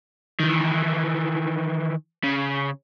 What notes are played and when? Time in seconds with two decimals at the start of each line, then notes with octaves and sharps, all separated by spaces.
0.40 D#3 E3
2.23 C#3